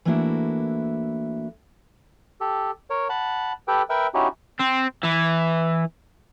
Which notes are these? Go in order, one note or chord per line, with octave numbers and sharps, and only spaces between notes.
E3 A3 A#3 D4 E4 F#4
G4 A4
A#4 C#5
F#5 A5 B5
G4 A4 B4 G5
A#4 B4 E5 G5 E6
C#4 D#4 E4 F#4 G4
C4
E3